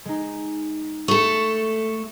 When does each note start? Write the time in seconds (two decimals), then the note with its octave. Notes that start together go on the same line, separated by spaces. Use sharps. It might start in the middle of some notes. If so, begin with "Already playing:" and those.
0.05 G#3 D#4
1.08 A3 A4 C#6